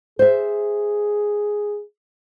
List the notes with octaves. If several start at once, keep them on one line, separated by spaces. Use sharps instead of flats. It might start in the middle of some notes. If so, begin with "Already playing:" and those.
G#4 C5 E5